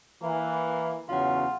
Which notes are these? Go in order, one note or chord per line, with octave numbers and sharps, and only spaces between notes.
E3 A#3
E2 C#3 F#3 F4 F5 F#5